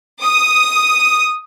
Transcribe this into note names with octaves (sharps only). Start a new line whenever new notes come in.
D#6